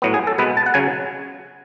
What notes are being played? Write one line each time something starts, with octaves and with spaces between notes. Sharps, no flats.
A2 F#3 B3
G#4
A4
B2 G#3 B3 B4
A5
F#5
C#3 F#3 G#5